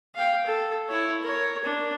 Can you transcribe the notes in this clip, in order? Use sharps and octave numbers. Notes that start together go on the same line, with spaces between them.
F5 G5
A4
E4 C#5
A#4 C#5
D4